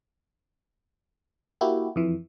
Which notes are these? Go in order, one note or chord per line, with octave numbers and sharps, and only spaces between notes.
A#3 E4 F#4 G4
F2 E3